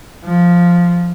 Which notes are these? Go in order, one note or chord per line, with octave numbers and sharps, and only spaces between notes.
F3